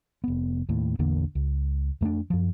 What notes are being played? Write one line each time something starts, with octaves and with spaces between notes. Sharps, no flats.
F1 B3
D#2 A2
A1 E2 D3 A#3
C#2
F2 A3 C4 D4
F#2 F3